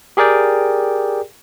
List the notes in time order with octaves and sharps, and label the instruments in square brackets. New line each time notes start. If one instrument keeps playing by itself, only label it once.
[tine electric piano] G4 G#4 A#4 D5 G5